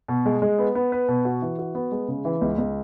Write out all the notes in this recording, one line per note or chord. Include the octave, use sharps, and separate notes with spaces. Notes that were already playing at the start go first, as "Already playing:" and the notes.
B2
G#3
G#3
B3
B3
B4
B2
F#4
E3
F#4
B3
G#3
C#3
E3
C#2
C#2